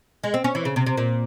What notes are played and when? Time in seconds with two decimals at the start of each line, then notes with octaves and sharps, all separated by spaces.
0.24 G#3
0.34 C4
0.44 C#4
0.55 E3
0.65 C#3
0.76 C3
0.86 C3
0.97 A#2